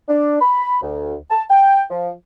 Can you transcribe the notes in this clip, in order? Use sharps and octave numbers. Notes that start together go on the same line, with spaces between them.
D4
B5
D2
A5
G5
F3